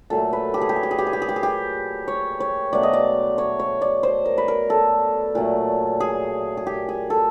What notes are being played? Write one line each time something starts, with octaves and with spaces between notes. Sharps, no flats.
A#2 F#3 A3 A4
B4
G4
G#4
G4
G#4
G4
G#4
G4
G#4
G4
G#4
G4
G#4
G4
C#5
C#5
B2 F#3 A3 D5
D#5
D5
C#5
C#5
D5
C5
A#4
B4
A#4
A4
A#2 F#3 A3
G#4
G#4
G4
G#4
A4